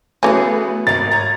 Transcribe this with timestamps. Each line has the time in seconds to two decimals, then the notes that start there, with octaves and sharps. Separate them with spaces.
0.23 E3 A3 B3 C#4 F#4 G#4 B4
0.87 G#1 A#4 F5 A6
1.12 C#5 A#5 G#6